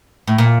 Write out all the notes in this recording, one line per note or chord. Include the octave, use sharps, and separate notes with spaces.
A2
A#2